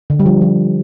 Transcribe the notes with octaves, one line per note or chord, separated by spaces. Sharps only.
D3
G3
F3
F3